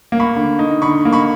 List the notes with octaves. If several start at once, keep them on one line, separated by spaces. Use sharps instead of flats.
A#3
B5 C#6
D3
D#4
D3 B5 C#6
A#3
B5 C#6